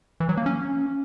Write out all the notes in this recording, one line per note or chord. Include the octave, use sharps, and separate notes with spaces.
E3
F#3
A#3
C#4